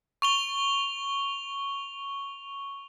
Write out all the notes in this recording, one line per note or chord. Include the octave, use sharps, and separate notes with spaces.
C#6 F7 G7